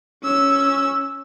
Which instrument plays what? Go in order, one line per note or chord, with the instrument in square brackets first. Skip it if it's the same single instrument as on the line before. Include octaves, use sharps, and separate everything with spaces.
[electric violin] C#4 E6